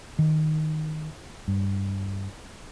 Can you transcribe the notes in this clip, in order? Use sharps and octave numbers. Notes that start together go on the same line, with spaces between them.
D#3
G2